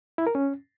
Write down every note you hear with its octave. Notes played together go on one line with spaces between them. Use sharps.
E4
A#4
C#4